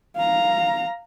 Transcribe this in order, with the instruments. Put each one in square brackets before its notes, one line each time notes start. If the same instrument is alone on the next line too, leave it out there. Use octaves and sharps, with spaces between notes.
[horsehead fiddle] F5 A#5